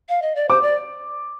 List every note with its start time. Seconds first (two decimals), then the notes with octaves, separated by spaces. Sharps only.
0.09 F5
0.22 D#5
0.35 D5
0.49 C5 D6
0.62 D5